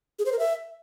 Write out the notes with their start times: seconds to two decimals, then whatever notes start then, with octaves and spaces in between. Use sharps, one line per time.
0.19 G#4
0.26 C5
0.32 A#4
0.39 E5